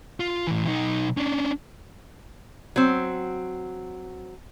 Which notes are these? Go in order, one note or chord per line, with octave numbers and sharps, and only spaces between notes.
F4
A2 E3
B1 D#4
C#4 D4
F#3 C4